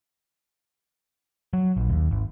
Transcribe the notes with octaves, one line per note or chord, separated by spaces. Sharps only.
F#3
A#1
D#2
G#1